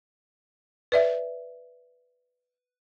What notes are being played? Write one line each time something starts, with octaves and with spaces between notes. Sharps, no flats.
B4 D5 E5